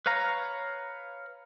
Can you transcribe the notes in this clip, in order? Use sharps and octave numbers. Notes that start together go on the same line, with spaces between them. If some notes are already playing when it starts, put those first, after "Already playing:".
B4 C#5 F5 A#5